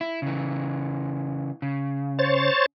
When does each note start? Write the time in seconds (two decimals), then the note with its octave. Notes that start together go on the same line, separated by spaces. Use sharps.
0.01 E4
0.22 C#3 E3
1.62 C#3
2.19 C5 C#5 A6